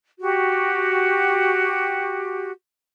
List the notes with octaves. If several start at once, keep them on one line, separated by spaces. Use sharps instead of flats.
F#4 G4